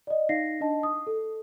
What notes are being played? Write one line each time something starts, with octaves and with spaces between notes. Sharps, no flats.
D5 D#5
D#4 F5 A#6 C7
D4 D#5 A5
D#6
A4